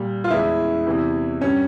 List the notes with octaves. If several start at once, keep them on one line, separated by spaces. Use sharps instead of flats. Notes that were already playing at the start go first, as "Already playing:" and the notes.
Already playing: A#2 G3
F4
E2 E3 G#3 E4
E2 C3 E3
G2 G3 C#4